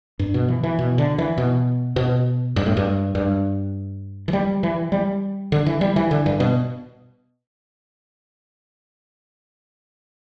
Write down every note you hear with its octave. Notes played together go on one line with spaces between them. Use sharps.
G2
B2
E3
E3
B2
D3
E3
B2
B2
G2
A2
G2
G2
E3
G3
E3
G3
D3
E3
G3
E3
D3
G2
B2